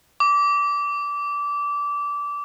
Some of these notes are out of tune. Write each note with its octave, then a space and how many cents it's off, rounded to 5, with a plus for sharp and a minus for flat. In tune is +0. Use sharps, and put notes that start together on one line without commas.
D6 -20